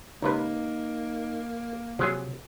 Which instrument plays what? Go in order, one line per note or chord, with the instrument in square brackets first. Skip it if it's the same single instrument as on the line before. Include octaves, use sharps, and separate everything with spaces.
[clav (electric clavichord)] C#2 C3 B4 [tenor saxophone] A#3 [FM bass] D#4
[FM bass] C3 [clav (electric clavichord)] F3 F#3 G#4